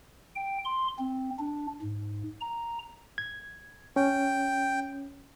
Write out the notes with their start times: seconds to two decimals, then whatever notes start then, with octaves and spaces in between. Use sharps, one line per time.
0.36 G5
0.65 C6
0.99 C4
1.39 D4
1.82 G#2
2.41 A#5
3.18 G#6
3.96 C#4 G5